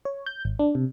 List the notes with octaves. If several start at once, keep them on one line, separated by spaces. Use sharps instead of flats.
C#5
G6
G#1
D4
C3